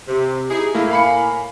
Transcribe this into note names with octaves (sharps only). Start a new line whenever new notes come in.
C3 G4
D#4 E4 G#4
A2 A3 A#3 E4
F5 G#5 B5 C#7